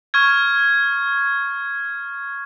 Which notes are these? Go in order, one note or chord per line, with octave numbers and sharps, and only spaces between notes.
C#6 F6 G#6